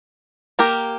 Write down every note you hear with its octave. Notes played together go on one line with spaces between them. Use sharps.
A#3 G4 A#4